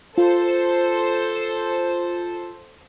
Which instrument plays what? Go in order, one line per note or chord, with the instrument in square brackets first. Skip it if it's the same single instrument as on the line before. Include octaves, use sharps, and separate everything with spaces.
[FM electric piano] F4 [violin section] A4 C5